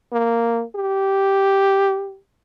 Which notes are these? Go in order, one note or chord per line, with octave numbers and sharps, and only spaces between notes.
A#3
G4